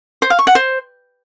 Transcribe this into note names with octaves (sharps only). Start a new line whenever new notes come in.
C5
F5
C#6
F#5
C5